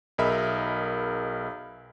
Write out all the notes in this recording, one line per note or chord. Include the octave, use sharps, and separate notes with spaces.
B1 G#4 A#4 D#5 E5 B5